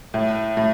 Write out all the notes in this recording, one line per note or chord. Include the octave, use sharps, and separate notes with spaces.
A2
A2